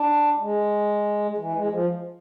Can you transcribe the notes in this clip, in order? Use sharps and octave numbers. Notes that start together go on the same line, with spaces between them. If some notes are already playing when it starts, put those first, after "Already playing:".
Already playing: D4
G#3
E3
G#3
F3